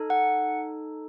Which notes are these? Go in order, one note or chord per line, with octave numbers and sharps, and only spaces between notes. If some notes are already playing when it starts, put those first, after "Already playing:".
Already playing: D#4 A4
F#5